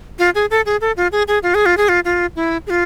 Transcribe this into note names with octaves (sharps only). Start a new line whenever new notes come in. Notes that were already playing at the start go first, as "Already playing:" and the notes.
F4
G#4
A4
G#4
A4
F4
G#4
G#4
F4
G#4
F4
G#4
F4
F4
E4
G#4
F4